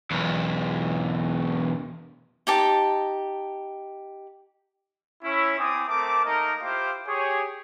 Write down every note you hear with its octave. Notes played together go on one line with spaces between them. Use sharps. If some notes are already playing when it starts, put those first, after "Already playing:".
B1 E2
D#4 G4 A5
C#4 E4 C#5
C4 E4 G#5 D6 D#6
A3 C4 A#4 A5 D6
A3 A#3 D#4 A#4 D#5
E4 F4 G4 C5 F5 D6
G4 G#4 C#5